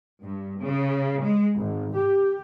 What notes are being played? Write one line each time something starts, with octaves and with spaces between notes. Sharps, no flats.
G2
C#3
G#3
G#1
G4